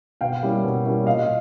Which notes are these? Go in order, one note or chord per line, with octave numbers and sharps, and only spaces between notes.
B2 F5 G5
G3 A#3 C#4 E4
B2
G3 A#3 C#4 E4
A#2 D#5 F5